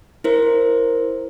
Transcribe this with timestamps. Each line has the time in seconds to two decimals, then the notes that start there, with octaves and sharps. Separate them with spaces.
0.24 E4 A#4 C5